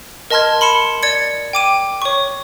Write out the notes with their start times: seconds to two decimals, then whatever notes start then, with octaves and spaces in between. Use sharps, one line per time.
0.30 A#4 D#5 A5 C6 F6 G#6
0.61 B5 C6 C#7 E7
1.03 D5 G#6 C#7
1.53 G5 D6 D#7
2.02 C#5 C#6